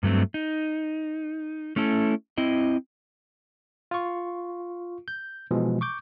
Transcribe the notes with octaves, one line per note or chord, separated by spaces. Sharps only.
G2 F#3 A3 C4
D#4
A3 C#4 E4 A4
C4 E4 D#5
F4 C#6
G6
B2 E3 F3 G#3
C#6 D6 G6